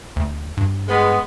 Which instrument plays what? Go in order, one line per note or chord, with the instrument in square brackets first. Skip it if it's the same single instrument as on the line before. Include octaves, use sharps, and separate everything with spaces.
[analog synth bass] D2
G2
[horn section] G#3 B3